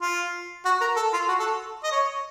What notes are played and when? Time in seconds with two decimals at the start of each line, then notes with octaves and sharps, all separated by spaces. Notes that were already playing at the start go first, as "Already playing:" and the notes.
0.01 F4
0.65 F#4
0.81 A#4
0.96 A4
1.13 F4
1.28 F#4
1.39 A4
1.84 D#5
1.92 C#5